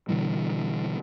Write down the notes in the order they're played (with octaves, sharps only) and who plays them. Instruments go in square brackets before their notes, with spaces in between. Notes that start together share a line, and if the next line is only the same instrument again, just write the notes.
[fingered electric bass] B2 D3 E3 G3